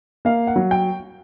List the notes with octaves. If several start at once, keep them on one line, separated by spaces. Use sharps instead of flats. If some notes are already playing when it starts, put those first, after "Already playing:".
A#3 F5
F#5
F#3
G5